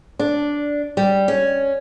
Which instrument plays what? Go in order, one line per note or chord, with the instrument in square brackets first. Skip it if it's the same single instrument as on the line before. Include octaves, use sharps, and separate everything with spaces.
[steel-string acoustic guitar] D4
G3
C#4